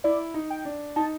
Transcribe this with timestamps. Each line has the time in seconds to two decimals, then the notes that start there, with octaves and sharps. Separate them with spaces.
0.04 E4 D5
0.34 D#4
0.50 G5
0.65 D4
0.96 D#4 A5